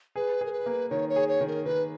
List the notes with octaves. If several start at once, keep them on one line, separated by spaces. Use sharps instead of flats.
G#4 B4
G#4 A#4
B4
A#3
D#3 C#5
C#5
G#4
C#5
D#3
A#4
D#3 B4